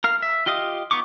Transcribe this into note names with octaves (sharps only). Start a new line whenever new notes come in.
A#4 F5
E5
F4 G4 D#5 F5 D#6
B3 D#4 C#6 D6